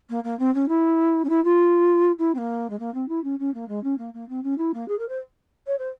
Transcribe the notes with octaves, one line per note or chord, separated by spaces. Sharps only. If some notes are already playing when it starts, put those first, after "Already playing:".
A#3
A#3
C4
C#4
E4
C#4
E4
F4
E4
C4
A#3
G#3
A#3
C4
E4
C#4
C#4
A#3
G#3
C#4
A#3
A#3
C4
C#4
E4
A#3
G#4
A#4
C5
C#5
C5